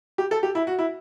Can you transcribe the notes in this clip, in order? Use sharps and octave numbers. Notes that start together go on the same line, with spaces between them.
G4
A4
G4
E4
F#4
E4